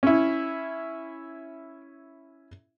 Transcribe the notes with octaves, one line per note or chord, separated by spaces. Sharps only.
C#4 E4